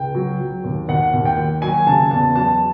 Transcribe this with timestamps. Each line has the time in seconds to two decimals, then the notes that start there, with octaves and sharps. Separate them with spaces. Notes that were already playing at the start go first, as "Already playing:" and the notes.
Already playing: C#2 G5
0.15 F#3
0.40 F#3
0.64 D#2
0.88 D#2 F#5
1.13 D#2
1.25 G5
1.37 D#2
1.62 F#3 G#5
1.87 C#3 A5
2.11 E2 A5
2.35 F#3 A5